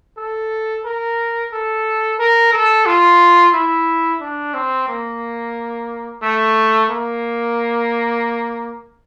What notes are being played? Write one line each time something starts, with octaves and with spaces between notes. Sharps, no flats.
A4
A#4
A4
A#4
A4
F4
E4
D4
C4
A#3
A3
A#3